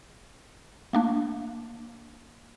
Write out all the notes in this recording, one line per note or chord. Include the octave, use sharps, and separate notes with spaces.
A3 A#3 D4